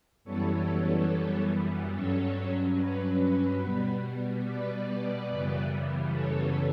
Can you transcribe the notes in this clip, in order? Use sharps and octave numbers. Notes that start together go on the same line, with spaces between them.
F#2 E3 G3 B3 A4 C#5
G2 F#3 C#4 A4 C#5
B4
B2 G3 B3
B4 D5
F#2 C#3 E3 G3 B3
A4 C#5